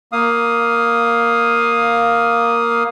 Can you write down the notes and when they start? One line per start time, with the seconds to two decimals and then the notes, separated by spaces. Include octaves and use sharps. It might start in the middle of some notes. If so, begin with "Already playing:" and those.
0.12 A#3 F5 D#6